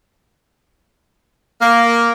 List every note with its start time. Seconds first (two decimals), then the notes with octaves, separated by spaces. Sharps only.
1.62 A#3